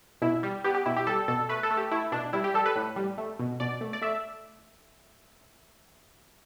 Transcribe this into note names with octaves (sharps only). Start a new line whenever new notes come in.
B2 E4
G3
B3 G4
G4
B2 E4
G4
G3 A4
B2 A4
A3 B4
A4
A3
G4
A3 E4
B2 D4
G3 E4
G4
G3 A4
B4
A2
G3
A3
B2
B2 D5
A3
D5
A3 E5